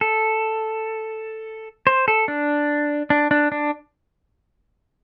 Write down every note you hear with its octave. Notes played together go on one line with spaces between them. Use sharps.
A4
C5
A4
D4
D4
D4
D4